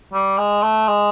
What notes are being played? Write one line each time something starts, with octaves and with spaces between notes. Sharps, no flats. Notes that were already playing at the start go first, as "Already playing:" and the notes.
G3
G#3
A3
G#3